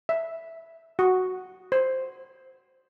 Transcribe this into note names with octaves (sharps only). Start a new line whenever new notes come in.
E5
F#4
C5